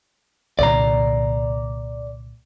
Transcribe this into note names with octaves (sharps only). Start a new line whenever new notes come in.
C2 A#2 D3 D5 A#5